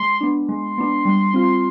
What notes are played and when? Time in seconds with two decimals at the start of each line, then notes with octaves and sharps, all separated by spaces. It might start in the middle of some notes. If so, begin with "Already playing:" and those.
Already playing: G#3 C6
0.21 B3 D4
0.49 G#3 C6
0.78 B3 D4
1.05 G3
1.34 C4 F4